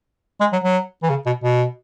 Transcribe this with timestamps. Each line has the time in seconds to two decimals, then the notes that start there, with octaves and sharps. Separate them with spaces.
0.40 G#3
0.53 F#3
0.64 F#3
1.03 E3
1.10 C#3
1.26 B2
1.44 B2